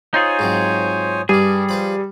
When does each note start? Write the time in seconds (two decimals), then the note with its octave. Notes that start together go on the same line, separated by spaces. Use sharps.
0.14 D#4 F4 G#4 C5 C#5 G#5
0.39 G#2 F#3 C4
1.29 G2 G3 D4 G#4
1.69 F3 B4 C5 B5